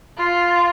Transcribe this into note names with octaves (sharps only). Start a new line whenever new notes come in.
F4